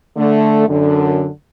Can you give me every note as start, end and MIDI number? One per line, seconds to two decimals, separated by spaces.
0.17 0.68 50
0.17 0.68 57
0.68 1.27 42
0.68 1.27 50